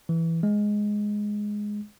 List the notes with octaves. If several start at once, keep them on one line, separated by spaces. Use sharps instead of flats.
E3
G#3